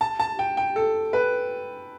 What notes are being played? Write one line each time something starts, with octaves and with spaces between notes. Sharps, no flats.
A5
A5
G5
G5
A4
B4